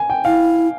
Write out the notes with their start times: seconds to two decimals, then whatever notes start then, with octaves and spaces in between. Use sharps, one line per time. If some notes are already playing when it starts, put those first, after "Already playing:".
Already playing: G#5
0.10 G5
0.25 E4 F5